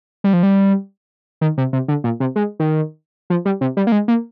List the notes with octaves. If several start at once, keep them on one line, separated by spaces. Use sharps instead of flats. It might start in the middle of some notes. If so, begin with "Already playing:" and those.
G3
F3
G3
D#3
C3
C3
D3
A#2
C3
G#3
D#3
F3
G3
C3
G3
A#3
G#3
A#3